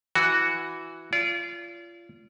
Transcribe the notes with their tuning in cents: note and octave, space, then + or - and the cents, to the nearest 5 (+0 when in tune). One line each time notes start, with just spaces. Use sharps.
E3 +0 F#4 +0 G#5 +0
F4 -25 D5 -35